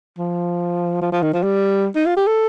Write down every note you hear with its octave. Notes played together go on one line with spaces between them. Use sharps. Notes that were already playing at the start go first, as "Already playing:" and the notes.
F3
F3
F3
D#3
F3
G3
D#4
F4
G4
A4